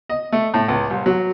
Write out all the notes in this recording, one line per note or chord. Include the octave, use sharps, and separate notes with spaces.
D#5
A3
A2
C#2
C2
F#3